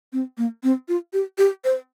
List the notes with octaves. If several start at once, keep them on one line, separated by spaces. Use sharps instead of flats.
C4
A#3
C4
F4
G4
G4
C5